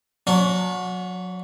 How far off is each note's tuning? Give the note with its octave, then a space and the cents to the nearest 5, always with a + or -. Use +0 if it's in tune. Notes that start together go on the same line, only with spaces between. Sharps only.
F#3 -25 C#4 +45